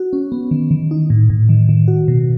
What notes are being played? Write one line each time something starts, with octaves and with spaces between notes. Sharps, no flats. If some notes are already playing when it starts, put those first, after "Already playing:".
Already playing: F#4
C#4
B3
D#3
D#3
D#4
A2
A2
D#3
D#3
F#4
B2